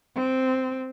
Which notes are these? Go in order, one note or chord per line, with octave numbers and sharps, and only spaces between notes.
C4